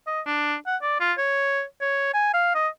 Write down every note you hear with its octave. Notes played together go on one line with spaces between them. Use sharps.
D#5
D4
F#5
D5
F4
C#5
C#5
G#5
F5
D#5